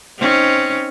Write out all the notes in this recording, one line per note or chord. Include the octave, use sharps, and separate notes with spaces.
C4 C#4 D#4